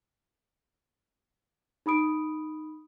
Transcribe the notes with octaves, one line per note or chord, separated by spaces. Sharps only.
D#4 B5 D#6 D7